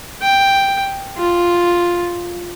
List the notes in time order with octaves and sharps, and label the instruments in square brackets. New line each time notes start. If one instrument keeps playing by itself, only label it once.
[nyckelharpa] G5
F4